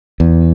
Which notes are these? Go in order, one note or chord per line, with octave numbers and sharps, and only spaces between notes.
E2